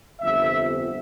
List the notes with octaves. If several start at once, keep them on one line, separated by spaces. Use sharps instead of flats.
G1 F2 C3 E5